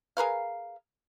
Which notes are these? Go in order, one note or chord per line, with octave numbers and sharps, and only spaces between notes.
G#4 A#4 B4 F5